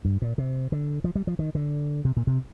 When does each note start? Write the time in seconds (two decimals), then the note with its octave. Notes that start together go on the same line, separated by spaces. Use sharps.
0.05 G2
0.22 A#2
0.38 C3
0.72 D3
1.04 F3
1.16 G3
1.27 F3
1.39 D#3
1.55 D3
2.05 C3
2.17 A#2
2.27 C3